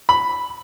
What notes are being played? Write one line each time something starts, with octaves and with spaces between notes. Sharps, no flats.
B5